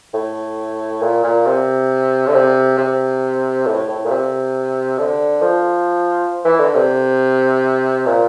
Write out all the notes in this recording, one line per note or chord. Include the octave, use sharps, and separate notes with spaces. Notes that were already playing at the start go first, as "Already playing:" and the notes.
A2
A#2
A#2
C3
D3
C3
C3
A2
A2
A#2
C3
D3
F3
E3
D3
C3
A#2